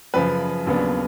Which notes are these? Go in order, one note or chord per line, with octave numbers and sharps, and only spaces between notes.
F#2 C#3 F3 B4
D#2 C#3 F#3 B3 D4